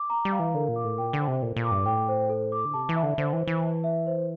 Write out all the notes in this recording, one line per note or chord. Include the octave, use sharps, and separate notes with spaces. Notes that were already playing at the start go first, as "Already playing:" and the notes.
Already playing: D6
A#5
G3
F5
E3
D3 A#4
A#2
D6
A2
A#2 G5
D3
C5
C3
A#2 A4
A#2
D6
G2
A2 G5
C5
A4
D6
D3
C3 A5
E3
E5
D3
D3 C5
E3
C5
E3
A5
E5
C5